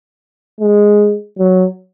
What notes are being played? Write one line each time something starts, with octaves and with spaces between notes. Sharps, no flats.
G#3
F#3